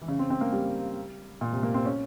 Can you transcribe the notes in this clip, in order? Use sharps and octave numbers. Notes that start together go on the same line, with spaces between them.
E3
C#3
C4
C4
A#3
G3
A#2
C3
A#3
C4
C#4